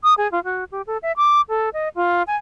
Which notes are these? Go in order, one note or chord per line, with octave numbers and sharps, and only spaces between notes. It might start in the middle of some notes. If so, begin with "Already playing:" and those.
D#6
G#4
F4
F#4
G4
A4
E5
D6
A4
D#5
F4
G#5